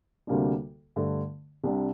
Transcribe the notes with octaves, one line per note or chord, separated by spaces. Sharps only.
D2 C3 G3 A#3 D4
G2 D3 A3
C2 C3 G3 D4